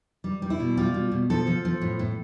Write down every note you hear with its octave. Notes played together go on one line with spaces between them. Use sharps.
G3
G3
E4
B2
G3 F4
B2
B2
F3 A4
F3
F3
A2
A2